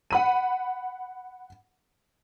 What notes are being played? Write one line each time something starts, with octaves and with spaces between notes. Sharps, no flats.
F#5 B5 D#7